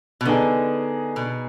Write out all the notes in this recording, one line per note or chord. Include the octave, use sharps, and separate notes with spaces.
B2
D3 B3 D#4 G#4
B2